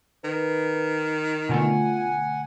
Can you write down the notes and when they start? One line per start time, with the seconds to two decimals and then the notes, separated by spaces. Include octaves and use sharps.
0.25 D#3 B4
1.49 B2 D3 A3 F4 F#5 G#5